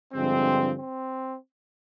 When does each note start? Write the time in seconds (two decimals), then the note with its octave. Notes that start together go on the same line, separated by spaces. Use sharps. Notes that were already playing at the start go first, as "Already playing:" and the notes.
0.13 G2 D3 F3 G#3 C4
0.76 C4